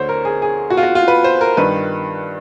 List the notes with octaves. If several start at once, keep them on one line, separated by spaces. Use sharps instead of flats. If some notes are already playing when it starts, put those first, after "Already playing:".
Already playing: D2 D3 C5 C#5
A#4
G#4
G#4
F#4
F4
F#4
F4
B4
C5
A#4
G2 D#3 B4